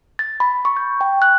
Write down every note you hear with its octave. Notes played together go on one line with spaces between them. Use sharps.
A6
B5
C#6
G6
G5
F#6